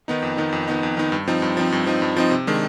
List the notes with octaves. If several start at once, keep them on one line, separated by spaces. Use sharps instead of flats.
D#3 B3 D#4
F2
D#3 B3 D#4
F2
D#3 B3 D#4
F2
D#3 B3 D#4
G2
F3 C4 D#4
G2
F3 C4 D#4
G2
F3 C4 D#4
G2
F3 C4 D#4
C3
D#3 G#3 D4